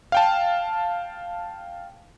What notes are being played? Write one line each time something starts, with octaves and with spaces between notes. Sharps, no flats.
F5 G5 A5